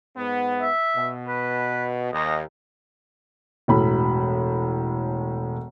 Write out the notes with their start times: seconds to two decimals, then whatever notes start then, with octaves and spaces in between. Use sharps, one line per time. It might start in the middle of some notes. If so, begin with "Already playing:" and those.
0.16 G#2 B3
0.61 E5
0.95 B2
1.27 B4
2.12 D#2 D#5
3.68 E1 A2 B5